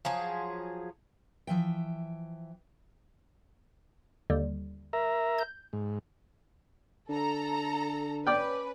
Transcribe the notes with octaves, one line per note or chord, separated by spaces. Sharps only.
F3 F#3 G#4
E3 F3 E5 G5
D#2 D3 G3
A#4 E5 A#5
G6
G#2
D3 A4 A#5
C#4 B4 D5 G5